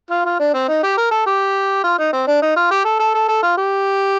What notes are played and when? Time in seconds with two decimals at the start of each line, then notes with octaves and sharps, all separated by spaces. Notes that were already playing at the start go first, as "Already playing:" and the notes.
0.10 F4
0.25 F4
0.39 D4
0.54 C4
0.68 D#4
0.83 G4
0.98 A#4
1.12 A4
1.26 G4
1.84 F4
1.98 D#4
2.13 C4
2.27 D4
2.42 D#4
2.57 F4
2.71 G4
2.85 A4
3.00 A4
3.14 A4
3.29 A4
3.43 F4
3.57 G4